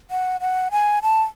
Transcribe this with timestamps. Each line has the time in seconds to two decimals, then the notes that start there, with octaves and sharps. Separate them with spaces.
0.11 F#5
0.41 F#5
0.72 G#5
1.03 A5